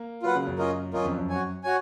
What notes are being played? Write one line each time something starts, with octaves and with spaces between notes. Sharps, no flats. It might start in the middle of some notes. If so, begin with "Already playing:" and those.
Already playing: A#3
F#3 F4 B4 F#5
C#3
F#2
C#4 F4 A#4 D#5
F#2 C#4 F4 A#4 D#5
F2
F#2
F#4 C#5 G#5
F#4 C#5 G#5